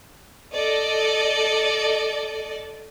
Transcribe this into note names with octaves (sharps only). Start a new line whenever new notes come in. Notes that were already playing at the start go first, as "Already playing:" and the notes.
A4 D5 D#5